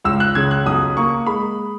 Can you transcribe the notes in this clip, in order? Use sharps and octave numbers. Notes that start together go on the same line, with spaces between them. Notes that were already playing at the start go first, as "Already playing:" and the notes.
C#2 E6
F#6
C#3 G#6
F#6
B1 D#6
A#3 C#6
G#3 B5